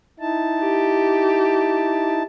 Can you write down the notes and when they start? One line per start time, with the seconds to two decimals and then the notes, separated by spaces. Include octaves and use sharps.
0.20 D#4 E4 A5
0.61 G4